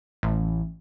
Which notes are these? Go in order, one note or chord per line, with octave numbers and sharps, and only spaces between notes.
A1